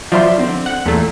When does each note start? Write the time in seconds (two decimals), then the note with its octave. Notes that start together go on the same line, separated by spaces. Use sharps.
0.12 F3 F#3 F4 D5 E5 C6
0.38 D3 C4
0.66 F#5
0.86 E2 A#2 A3